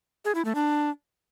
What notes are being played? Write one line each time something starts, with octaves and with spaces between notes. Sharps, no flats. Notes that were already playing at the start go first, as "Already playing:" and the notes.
G#4
E4
A3
D4